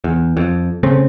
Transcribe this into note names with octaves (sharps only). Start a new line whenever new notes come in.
E2
F2
C#3 A3 C4 C#4